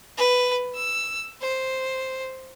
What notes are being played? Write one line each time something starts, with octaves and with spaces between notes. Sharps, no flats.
B4
E6
C5